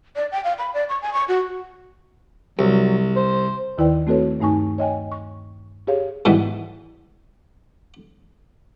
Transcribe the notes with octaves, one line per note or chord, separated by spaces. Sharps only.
D5
G5
F5
B5
D5
C#6
G#5
C#6
F#4
C2 F#3
C5
D#2 D#3 E4 B4 D5 G5
A3 C4 F#4 A4 B4 C#5
G2 A3 D#4 G#5 C#6
C#5 D#5 G5 G#5
C#6
G4 G#4 C#5 F5
G#2 B2 D#3 E3 G3